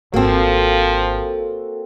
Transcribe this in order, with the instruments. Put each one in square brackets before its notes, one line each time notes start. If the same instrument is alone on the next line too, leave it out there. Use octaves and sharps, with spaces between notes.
[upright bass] G#1 [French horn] F3 [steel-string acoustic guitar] A#3 C4 [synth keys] F#4 A4